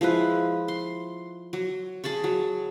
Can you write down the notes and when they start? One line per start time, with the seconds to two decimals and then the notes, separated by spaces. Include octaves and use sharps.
0.01 F3 G#3 E4 B4
0.68 C6
1.53 F#3
2.04 G#4 A5 B5 C#6
2.24 F#3